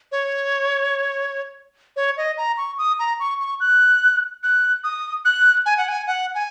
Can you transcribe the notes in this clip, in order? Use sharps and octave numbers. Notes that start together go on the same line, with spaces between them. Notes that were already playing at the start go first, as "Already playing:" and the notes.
C#5
C#5
D#5
A#5
C#6
D#6
A#5
C#6
C#6
F#6
F#6
D#6
F#6
G#5
F#5
G#5
F#5
G#5